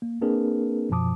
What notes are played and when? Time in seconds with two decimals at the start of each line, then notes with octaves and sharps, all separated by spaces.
0.02 A#3
0.21 A#3 C4 D4 G#4 A#4 B4
0.90 F#2 B2 F3 A5 D6 D#6